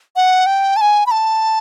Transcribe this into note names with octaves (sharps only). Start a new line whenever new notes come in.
F#5
G5
A5
G#5
B5
A5